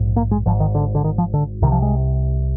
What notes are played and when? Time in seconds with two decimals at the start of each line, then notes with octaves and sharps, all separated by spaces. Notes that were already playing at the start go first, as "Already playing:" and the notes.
Already playing: A#1 G#2
0.16 A#3
0.31 G#3
0.46 G#1 G#2 F3
0.60 D#3
0.75 D3
0.95 D3
1.04 D#3
1.18 F3
1.34 D3
1.62 C2 C3 D#3
1.72 F3
1.82 G#3